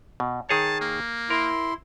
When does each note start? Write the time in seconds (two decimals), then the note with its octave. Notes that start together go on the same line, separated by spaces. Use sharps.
0.20 B2
0.49 D#3 G#4 C#5 A5
0.81 A#3
1.30 E4 A#4 C6